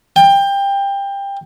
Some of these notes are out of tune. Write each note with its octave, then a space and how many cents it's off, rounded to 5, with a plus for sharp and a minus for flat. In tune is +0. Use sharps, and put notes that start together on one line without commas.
G5 +20